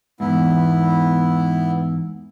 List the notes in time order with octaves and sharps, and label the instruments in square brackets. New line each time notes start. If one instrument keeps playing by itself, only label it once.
[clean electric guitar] E2 G#2 [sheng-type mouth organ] B3 E4